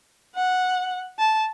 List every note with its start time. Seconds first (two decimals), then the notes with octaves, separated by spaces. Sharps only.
0.35 F#5
1.19 A5